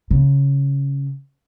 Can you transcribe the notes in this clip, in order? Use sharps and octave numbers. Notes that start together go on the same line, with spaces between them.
C#3